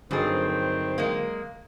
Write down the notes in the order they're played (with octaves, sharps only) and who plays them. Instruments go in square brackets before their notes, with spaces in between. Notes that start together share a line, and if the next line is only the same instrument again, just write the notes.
[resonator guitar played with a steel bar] G2 G#4 [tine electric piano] D3 F#3 A6 [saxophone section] D#3 C4
[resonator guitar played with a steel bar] G#3 A#3